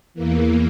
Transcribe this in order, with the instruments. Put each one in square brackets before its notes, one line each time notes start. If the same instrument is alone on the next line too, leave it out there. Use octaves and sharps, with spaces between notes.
[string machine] E2 E3 A#3